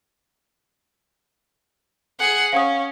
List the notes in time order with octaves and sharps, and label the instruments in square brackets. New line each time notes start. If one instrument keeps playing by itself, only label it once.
[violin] G#4 F#5
[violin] C#4 [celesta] F5 F#5 D#6